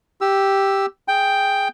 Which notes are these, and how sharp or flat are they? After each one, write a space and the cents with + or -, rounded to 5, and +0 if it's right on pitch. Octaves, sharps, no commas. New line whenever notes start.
G4 +0 E6 +0
G#4 +0 G5 +5